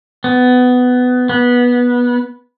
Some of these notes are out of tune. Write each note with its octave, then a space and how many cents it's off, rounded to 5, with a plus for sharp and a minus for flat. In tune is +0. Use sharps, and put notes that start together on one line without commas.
B3 +15
B3 -15